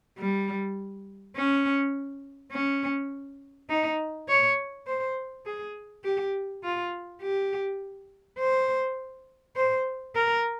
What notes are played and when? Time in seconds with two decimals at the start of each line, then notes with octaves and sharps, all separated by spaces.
0.18 G3
1.36 C#4
2.52 C#4
3.70 D#4
4.28 C#5
4.87 C5
5.46 G#4
6.04 G4
6.64 F4
7.22 G4
8.38 C5
9.56 C5
10.15 A#4